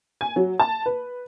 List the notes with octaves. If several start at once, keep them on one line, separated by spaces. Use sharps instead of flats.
G#5
F#3
A5
B4